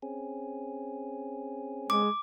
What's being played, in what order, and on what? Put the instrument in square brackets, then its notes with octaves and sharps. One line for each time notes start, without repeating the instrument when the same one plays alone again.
[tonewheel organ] C4 C#4 G#4
[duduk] G#3 [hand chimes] D6